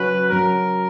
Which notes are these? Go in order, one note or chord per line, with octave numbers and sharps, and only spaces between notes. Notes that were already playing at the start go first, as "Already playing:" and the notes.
Already playing: F#3 C#4 F#4 B4
F#3 C#4 F#4 A#4